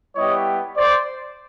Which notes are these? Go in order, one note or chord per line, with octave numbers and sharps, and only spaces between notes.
G3 B3 E4 G4 C#5 D#5
C5 D5